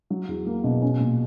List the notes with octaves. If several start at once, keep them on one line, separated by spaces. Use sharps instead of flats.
F#3
E2
A#3
B2
C#4
A#2